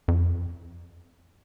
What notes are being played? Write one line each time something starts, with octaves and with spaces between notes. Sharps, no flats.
F2